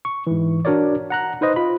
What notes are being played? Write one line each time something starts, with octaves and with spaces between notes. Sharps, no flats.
C#6
G#2 E3
D4 F#4 A#4 C#5 D5
F#5 A#5 F#6
D#4 B4 C5 D#5
F4 B5